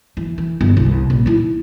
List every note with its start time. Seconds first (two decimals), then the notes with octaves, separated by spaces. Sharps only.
0.17 E3
0.38 E3
0.61 G1
0.77 C2
1.10 A1 A#2
1.26 D#4 E4